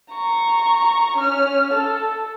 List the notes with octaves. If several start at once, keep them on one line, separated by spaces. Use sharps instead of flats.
A#5 C#6
C#4 F6
A4